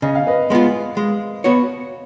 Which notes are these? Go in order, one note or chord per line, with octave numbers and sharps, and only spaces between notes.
C#3 D#5
F5
B4 D#5
G#3 B3 F4
G#3
B3 F#4 C#5